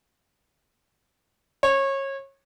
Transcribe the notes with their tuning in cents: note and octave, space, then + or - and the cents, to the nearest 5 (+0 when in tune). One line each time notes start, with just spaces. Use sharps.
C#5 -25